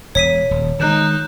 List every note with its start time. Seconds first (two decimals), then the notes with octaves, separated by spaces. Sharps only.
0.15 E1 C#5 B6 D#7
0.51 D#1
0.80 D#3 F#3 G#3 D#4 F#6 G6 E7